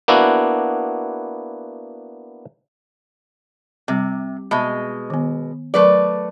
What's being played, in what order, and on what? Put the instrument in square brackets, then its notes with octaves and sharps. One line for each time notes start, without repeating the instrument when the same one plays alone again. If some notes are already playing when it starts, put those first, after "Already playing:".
[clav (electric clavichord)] A#3 B3 D4 E4 F#4
[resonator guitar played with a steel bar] C3 [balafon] G3 C4
[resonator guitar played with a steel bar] B2 G#3 [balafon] E5 A5 B5
[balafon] D#3 B3
[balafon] F#3 A#4 [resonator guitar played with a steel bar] A3 B4 D5